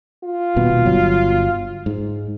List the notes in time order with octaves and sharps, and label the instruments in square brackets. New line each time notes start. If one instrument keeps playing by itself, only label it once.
[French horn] F4
[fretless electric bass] D#1 B2 B3
G1 F#3
G#2